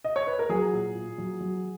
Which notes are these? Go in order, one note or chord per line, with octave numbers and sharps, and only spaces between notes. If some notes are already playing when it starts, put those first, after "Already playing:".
D#5
C#5
B4
A#4
F#3 G#4
A#2
A#2
F#3
F#3